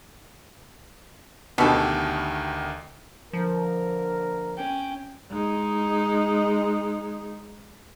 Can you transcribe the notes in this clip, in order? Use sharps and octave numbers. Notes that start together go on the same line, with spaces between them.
D2 B2 D3 D#3 B3 G4 A4
D3 F3 A#3 A#4
C#4 G5
G#3 D#4